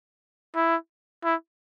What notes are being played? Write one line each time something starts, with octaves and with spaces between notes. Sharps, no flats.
E4
E4